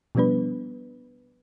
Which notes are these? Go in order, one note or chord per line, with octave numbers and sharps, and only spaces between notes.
B2 F3 G3 B3 D4 B4